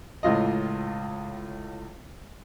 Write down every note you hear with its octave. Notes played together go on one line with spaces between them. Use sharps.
C#2 A2 F4 D#5